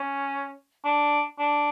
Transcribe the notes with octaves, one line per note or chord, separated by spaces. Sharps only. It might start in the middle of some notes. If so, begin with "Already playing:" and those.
Already playing: C#4
D4
D4